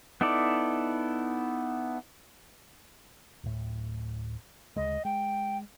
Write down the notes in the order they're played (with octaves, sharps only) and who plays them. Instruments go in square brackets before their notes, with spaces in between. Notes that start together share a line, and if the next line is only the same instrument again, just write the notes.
[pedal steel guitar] B3 D#4 E4 A4 D5
[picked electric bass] D1 A2
[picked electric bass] D2 C#3 G#3 [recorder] D#5
[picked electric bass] G#3 [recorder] G5